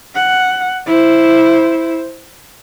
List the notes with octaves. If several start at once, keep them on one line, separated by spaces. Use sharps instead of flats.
F#5
E4 C5